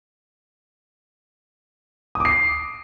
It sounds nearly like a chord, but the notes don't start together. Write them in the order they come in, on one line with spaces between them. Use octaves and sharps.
D#6 D6 C7